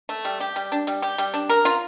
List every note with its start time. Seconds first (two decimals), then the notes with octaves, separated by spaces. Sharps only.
0.09 A3
0.25 G3
0.41 G4
0.56 G3
0.72 D4
0.87 G3
1.02 G4
1.18 G3
1.34 D4
1.49 A#4
1.65 F4